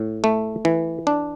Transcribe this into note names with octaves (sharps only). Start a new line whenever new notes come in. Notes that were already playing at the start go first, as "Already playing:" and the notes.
Already playing: A2
A3
E3
D4